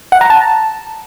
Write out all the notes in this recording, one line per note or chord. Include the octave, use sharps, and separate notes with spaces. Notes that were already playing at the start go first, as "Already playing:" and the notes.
F#5
A#5
A5